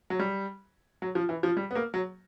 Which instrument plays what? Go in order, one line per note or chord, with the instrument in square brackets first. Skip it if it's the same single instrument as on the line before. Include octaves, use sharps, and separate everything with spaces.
[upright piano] F#3
G3
F#3
F3
E3
F3
G3
B3
A#3
F#3